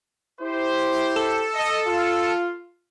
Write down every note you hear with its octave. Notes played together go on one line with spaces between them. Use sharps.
E4 G4 C5
A4
D#5
F4